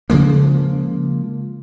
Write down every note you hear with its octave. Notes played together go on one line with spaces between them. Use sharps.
C#3 F3 G#3 A#3